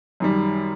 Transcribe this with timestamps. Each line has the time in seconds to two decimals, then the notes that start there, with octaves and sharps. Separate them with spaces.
0.20 F#2 D#3 G3